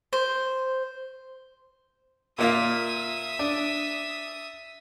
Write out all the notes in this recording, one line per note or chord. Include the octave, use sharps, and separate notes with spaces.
C5
A#2 A#3 F4 E5 D#6
D4